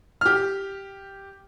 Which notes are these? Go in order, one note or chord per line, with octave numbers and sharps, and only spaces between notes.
G4 F6